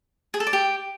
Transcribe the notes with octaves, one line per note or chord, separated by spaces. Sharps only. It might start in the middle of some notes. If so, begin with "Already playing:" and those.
G#4
A4
D5
G4